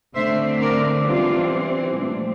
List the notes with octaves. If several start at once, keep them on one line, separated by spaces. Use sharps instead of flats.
D3 A3 C4 C5 E5
A#4 D5
E3 G3 C4 D4 F4
A#2 F3 A3 C4 D4